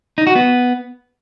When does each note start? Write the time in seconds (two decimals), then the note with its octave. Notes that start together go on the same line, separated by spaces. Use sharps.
0.18 D#4
0.27 F#4
0.36 B3